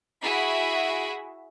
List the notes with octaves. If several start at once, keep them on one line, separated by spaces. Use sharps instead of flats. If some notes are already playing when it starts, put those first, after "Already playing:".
E4 F#4 G#4 E5